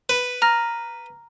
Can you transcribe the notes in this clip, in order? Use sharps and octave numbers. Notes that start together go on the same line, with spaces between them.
B4
A#5 F6 A#6